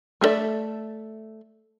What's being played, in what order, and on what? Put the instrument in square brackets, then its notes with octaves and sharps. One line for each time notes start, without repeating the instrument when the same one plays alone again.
[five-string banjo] A3 G#4 A4 D5 E5